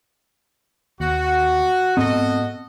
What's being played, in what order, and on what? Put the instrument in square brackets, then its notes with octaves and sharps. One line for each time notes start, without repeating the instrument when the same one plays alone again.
[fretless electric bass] D#2 [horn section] F#4
[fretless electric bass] G#2 B3 C4 [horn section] F#4 A4 D#5